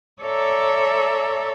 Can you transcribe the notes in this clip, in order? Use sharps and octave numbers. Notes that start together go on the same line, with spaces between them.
A4 C#5 D5 E5 A#5